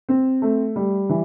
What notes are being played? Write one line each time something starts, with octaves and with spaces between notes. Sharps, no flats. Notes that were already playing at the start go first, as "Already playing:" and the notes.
C4
A3
G3
E3